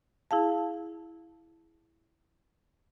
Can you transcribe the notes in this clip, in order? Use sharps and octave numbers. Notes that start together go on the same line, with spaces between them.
E4 G#4 F5 A5